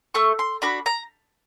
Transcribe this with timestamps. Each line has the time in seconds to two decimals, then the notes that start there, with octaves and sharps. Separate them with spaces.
0.14 A3 C#6
0.39 C6
0.62 D4 F#4 B5
0.86 A#5